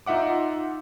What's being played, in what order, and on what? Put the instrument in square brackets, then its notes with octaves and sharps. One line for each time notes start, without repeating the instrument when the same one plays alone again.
[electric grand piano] D#4 F4 E5 F#5 D6